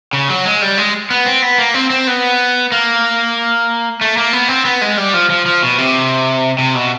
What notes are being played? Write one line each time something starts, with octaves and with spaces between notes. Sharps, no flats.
C#3
F#3
G#3
G3
G#3
B3
C4
B3
A#3
C4
C4
B3
A#3
A3
A#3
B3
C4
B3
G#3
G3
F3
F3
F3
B2
C3
C3
B2